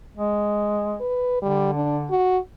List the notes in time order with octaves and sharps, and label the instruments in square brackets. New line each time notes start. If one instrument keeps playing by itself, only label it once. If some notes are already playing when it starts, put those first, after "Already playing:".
[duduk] G#3
[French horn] B4
[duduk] D3 [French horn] G3
[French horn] D4
F#4